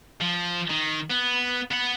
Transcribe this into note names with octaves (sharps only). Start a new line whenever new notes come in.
F3
D#3
B3
B3 F#5